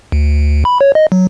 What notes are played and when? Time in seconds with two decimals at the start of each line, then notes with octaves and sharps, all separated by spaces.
0.12 D2
0.65 B5
0.81 C#5
0.95 D#5
1.12 F#3